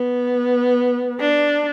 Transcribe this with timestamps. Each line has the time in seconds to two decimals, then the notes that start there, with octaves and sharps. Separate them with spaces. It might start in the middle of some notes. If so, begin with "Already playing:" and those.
Already playing: B3
1.20 D4